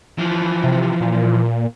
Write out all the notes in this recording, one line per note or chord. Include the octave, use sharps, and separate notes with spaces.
E3 F3
C3
A#2